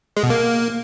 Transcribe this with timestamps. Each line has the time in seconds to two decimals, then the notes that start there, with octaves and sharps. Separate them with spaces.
0.17 G#3
0.23 B2
0.30 A#3